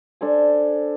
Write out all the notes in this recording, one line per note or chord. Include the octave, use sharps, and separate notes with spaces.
D4 A4 C5 G#5